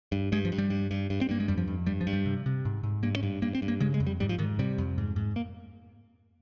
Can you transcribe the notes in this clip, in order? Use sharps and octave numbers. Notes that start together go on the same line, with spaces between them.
G2
G2 G#3
F3
G2
G3
G2
G2
G2
C4
G2 A#3
G#3
F2 G3
F3
F2
G2 G3
F3
G2
G3
C3
C3
G#2
G#2
G2 A#3
C#4
G2
G2 A#3
C4
G2
A#3
C#3 G#3
G#3
F2
G3
G#2 G3
F3
G#2 D#3
C3 G3
F2
G#2
G#2
A#3